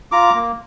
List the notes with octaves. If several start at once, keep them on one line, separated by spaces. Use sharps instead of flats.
F4 A#5 D6
A#3